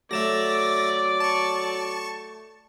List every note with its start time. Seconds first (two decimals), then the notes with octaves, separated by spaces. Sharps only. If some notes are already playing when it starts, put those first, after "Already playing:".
0.11 F#3 A3 D5 E5 A6 A#6 E7
1.20 A5 C#6